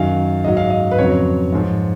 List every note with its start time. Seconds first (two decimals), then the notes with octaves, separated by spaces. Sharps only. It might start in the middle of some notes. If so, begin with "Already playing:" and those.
Already playing: F#2 D#3 F#3 F5
0.44 G#2 F#3 D#5
0.57 F5
0.70 D#5
0.91 B4
0.98 F2 C#3 F#3 C#5
1.52 G#2 F3